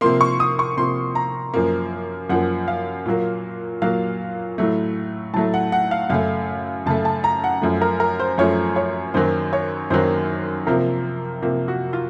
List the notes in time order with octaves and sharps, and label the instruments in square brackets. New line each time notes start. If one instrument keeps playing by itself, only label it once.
[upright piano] C3 F3 A#3 C6
C#6
D#6
C#6
C3 F3 A#3 C6
A#5
F#2 F3 A#3
F#2 F3 A#3 F#5
F5
A#2 F#3 A#3
A#2 F#3 A#3 F5
A2 F#3 A3
A2 F#3 A3 A5
F#5
F#5
F5
F#2 C#3 A3 F5
F#2 C#3 A3 A5
A5
A#5
F#5
F#2 F3 A3
A#4
A#4
C5
F#2 F3 A3 C#5
C#5
F#2 D#3 F#3 A#3 C5
C#5
F#2 D#3 F#3 A#3 C5
C3 F3 A#3 A#4
C3 F3 A#3
F#4
F4